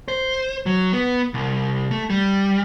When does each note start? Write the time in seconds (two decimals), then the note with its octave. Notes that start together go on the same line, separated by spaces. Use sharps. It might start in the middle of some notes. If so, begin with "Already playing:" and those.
0.08 C5
0.66 F#3
0.93 B3
1.34 C2
1.91 A3
2.10 G3